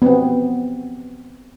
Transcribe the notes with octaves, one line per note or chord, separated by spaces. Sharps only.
B3 C4